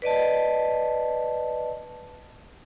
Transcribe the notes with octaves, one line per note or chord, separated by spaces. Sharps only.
B4 D5 D#5 A5